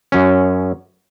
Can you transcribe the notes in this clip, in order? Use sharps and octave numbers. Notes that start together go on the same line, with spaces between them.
F#2 C#4